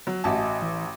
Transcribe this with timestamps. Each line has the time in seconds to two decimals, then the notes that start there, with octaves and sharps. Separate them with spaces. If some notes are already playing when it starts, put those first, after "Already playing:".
0.07 F#3
0.24 A1 F#4 D#5 E5 G#5 A5
0.62 E3